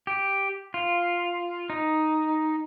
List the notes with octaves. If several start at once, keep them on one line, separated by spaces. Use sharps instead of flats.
G4
F4
D#4